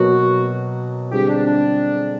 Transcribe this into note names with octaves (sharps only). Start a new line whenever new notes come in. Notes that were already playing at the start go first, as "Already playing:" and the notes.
Already playing: B2 F#3 A#3 F#4
D3 G3 C4 F4 G4 G#4
D4
D4